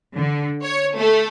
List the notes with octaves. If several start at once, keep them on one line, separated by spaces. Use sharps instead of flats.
D3
C#5
A3